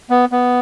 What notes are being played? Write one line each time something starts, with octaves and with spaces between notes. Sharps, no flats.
B3
B3